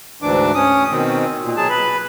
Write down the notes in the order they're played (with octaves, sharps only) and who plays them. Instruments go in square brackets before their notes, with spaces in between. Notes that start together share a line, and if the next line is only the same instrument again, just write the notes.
[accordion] D2 G#2 E3 D4 D6
C#4 D#6
B2 D#3 C4
A#2
B2 F#3 G#4 A5
B4 B5